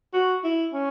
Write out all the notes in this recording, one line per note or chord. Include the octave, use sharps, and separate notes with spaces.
F#4
E4
C#4